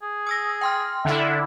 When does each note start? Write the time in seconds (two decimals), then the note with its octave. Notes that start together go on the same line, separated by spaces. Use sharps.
0.02 G#4
0.27 D#6 E6 A#6
0.61 G5 C6 F6
1.05 D3 E4 E5